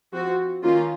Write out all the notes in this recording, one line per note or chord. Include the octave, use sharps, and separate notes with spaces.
F3 C4 F#4
D#3 A#3 C#4 F4